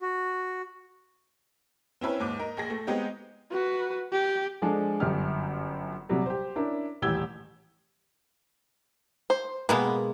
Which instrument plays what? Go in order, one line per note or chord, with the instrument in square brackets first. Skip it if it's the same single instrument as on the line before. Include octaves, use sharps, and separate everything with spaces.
[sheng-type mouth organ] F#4
[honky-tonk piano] C4 C#4 E4 B4
D#2 G#2 D6
D#4 A#4
A#1 G#4 A#6
A3
G#3 B3 C4 D#4 G4
[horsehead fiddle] F#4 B4
G4
[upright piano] F3 G#3 D4 A4
G1 F#2 G4 F6
A#1 C3 F#3 G3
G4 C5
C#4 D4 E4 A#4
D#1 A1 G4 E6 G#6 G7
[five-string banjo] C5
[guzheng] B2 G#3 A#3 [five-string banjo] B3 B4